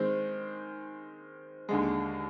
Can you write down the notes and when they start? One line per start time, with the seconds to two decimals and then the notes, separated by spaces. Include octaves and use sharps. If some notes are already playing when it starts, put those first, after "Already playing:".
Already playing: D#3 G#3 C4
1.69 D#2 D3 G#3